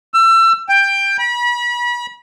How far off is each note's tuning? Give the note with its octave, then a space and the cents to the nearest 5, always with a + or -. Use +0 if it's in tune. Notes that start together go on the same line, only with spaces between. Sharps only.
E6 +30
G5 +15
B5 -35